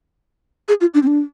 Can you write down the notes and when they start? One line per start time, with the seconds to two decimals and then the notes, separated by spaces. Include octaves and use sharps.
0.68 G#4
0.81 F4
0.94 D4
1.03 C4
1.07 D4